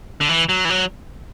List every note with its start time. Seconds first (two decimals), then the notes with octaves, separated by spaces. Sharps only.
0.21 D3
0.29 E3
0.49 F#3
0.65 E3
0.70 F#3